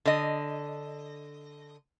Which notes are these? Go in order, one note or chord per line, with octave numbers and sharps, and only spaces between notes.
D3 D#5